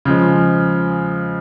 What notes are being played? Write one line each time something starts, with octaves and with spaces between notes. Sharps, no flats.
C#3 F3 G#3